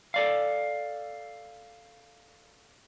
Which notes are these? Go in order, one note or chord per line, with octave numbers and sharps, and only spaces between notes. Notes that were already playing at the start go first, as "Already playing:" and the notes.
A4 D5 F5